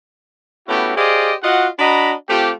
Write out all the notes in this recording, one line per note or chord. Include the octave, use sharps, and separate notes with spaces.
A3 B3 C#4 E4 F#4 G4
G4 G#4 C5 D5 D#5 F5
F4 F#4 D#5 F#5
D4 F#4 D#5 A#5 B5
A3 C4 F4 G4